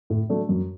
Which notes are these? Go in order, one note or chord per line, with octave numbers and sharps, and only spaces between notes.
A2
F#3 A3 D4
F#2